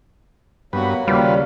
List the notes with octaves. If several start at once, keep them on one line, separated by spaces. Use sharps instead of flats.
G2 F#3 A#3 B3 F#4 B4
D#2 C#3 G3 F4 B4